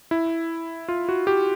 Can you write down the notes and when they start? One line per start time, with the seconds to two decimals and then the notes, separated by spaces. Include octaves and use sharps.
0.11 E4
0.88 F4
1.09 F#4
1.27 G4